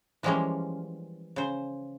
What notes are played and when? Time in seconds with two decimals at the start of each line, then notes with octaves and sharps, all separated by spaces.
0.23 E3 F3 G3 G#3 A#3 C#4
1.36 C#3 C5